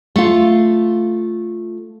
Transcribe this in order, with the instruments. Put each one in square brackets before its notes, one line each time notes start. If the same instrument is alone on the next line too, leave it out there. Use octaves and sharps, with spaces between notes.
[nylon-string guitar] A3 F4